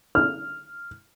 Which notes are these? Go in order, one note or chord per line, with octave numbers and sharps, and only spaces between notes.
F6